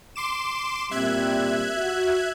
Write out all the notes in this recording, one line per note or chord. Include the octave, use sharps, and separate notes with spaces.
C6 D6 E7
A#2 G3 C4 E5 F#6 G#6
F#4